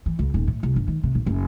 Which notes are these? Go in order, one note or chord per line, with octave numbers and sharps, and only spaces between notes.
E3
C#2
D#1
A2
C2
G1
D#3
C3
A#1
F#1